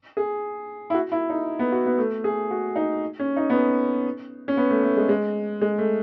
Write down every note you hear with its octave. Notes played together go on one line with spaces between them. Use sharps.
G#4
E4
F#4
E4
D#4
B3
F#4
B3
A3
G#4
F#4
D#4
C#4
D#4
B3
C#4
C#4
B3
A3
A3
G#3
G#3
G#3
A3